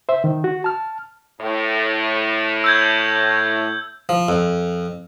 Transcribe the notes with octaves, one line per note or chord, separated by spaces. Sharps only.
C5 E5
D#3
F#4
A5 F6
A2
E6 G6 G#6
F3
F2